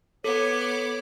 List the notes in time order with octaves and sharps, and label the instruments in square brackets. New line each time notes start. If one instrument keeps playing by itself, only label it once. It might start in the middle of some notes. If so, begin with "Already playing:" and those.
[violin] B3 D6 [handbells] A4 [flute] C#5